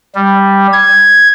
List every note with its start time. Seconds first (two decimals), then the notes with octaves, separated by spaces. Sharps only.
0.15 G3
0.73 G#6